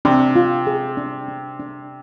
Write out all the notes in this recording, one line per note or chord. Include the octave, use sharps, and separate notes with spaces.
C3 D4
F4
G#4
D4
D4
D4